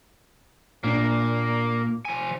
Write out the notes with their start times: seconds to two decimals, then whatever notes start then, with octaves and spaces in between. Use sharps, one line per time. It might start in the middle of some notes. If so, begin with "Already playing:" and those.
0.84 A#2 A#3 D4
2.05 F3 G#5